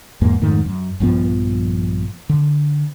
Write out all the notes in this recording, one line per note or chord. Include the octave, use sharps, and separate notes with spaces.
E2 G#2 A#3
F2 G#2 D#3 A3
F#2
A#1 G2 F3 B3
D3